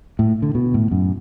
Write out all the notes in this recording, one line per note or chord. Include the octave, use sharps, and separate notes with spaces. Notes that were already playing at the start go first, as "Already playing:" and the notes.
A2
D3
B2
A2
F#2